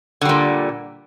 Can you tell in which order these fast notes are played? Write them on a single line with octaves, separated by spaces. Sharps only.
D3 G3 A#2